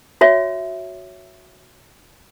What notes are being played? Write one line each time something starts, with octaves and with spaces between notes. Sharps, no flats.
F#4 C#5 E5